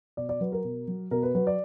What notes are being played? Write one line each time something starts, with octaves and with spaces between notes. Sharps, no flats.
B2 D5
D5
F#3 B4
A#4
B2
F#3
B2 A#4
B4
F#3 B4
D5